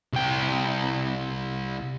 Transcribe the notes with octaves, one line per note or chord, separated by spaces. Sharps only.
C2 G5